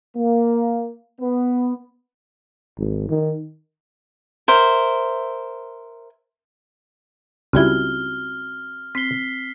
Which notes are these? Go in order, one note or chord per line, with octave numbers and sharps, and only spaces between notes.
A#3
B3
G#1
D#3
A#4 C5 E5
C#2 G3 C4 E4 F#4 F6 G#6 G7
C4 B6 C7 G7